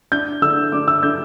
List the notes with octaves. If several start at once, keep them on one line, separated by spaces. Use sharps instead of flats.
D4 G6
D3 E6
D4 D6
E6
D3 G6